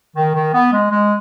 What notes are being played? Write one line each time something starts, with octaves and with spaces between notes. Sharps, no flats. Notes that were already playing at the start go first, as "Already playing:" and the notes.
D#3
D#3
B3
G#3
G#3